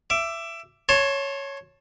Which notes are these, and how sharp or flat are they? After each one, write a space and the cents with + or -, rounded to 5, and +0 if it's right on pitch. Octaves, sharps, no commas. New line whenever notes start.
E5 +20 D6 +0
C#5 +0 A5 +0 C6 +35